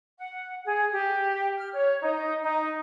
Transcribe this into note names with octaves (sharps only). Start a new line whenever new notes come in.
F#5
G#4
G4
F6
C#5
D#4
D#4